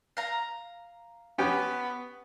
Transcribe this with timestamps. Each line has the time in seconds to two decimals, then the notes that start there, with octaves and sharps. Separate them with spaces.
0.17 F5 A#5
1.38 B3 C#4 G4